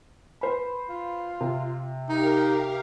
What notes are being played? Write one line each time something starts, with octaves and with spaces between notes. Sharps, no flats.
B4 C5 B5
F4
C3
D#4 G4 A#4 F5